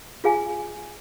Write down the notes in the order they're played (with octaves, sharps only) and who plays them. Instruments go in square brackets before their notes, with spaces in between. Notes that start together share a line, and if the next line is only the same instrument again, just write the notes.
[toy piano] F4 G#4 F5 G#5